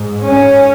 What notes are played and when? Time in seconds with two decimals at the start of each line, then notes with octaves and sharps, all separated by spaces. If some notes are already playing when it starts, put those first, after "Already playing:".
Already playing: G#2
0.26 C#4